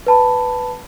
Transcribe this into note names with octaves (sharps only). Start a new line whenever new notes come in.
B4 A5 B5